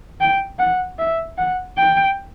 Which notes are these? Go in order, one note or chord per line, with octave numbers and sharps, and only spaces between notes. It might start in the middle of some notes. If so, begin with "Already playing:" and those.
G5
F#5
E5
F#5
G5